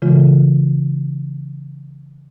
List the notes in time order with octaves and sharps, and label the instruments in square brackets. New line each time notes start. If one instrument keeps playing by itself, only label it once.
[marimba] C#3 E3 G#3 F4